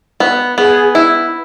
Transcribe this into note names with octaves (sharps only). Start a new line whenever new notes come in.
B3
B3 G#4
E4